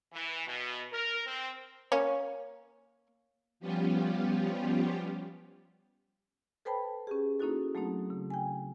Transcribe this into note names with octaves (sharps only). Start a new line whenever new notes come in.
E3
B2
A#4
C4
A#3 C#4 C#5
F3 G3 B3 C#4 F4 G4
A4 B4 C5 G5 A5 B5
C#4 G4 G#4
A#3 C#4 D#4 E4 F#4 A4
F#3 A3 A#3 C4 D#4
C#3
G5 G#5